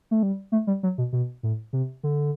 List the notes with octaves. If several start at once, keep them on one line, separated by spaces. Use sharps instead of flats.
A3
G3
A3
G3
F#3
B2
B2
A2
C3
D3